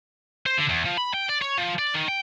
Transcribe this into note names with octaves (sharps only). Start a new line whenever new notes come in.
C5
D3
E2
F3
B5
G5
D5
C#5
F3
D5
D#3
G5